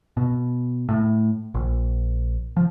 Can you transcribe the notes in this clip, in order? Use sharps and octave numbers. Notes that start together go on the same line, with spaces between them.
B2
A2
A#1
F3